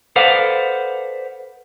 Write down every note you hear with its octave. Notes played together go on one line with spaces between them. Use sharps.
A4 B4 C5 D5 F5 F#5